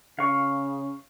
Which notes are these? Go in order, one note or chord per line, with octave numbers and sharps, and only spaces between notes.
C#3 F5 C#6